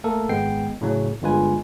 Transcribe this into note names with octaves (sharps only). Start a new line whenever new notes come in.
A3 A#3 A4 A#4
G#1 G#3 B3 G5 C7
A2 C#3 F#3
G1 G2 G#3 F4 B4 G#5